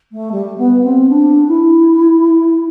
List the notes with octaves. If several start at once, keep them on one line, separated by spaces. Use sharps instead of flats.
A3
G3
B3
C4
D4
E4